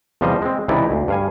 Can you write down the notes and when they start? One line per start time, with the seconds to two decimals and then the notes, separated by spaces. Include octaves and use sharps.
0.21 E2 C3 F3 G3 C5 D#5
0.42 G#3 C4
0.68 C#2 C3 E3 D#4 E4 D5
0.91 D2
1.08 G2 F5 G#5